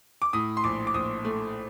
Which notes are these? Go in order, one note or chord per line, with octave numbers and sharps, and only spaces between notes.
D6
A2 D#6
C6
A#1 D6
D6
A#1 D#6
A3